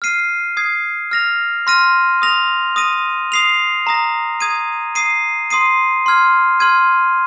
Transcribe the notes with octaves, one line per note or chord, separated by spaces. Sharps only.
F6 C7 D#7
D#6 G#6 C7
F6 A#6 F7
C6 F6 A#6 D#7
D#6 A#6 F7
D#6 A#6 D#7
D#6 C7 F7
A#5 D#6 A#6
D#6 G#6 D#7
D#6 C7 D#7
C6 D#6 C7 D#7
C6 F6 G#6
C6 F6 G#6 D#7